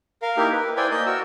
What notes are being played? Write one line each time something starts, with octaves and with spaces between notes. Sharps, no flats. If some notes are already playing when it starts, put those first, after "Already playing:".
A#4 F5
A#3 D#4 E4 G4 A#4
B4
E4 C5 D5 G5 G#5
A#3 D#5 G6
F#4 A#4 E6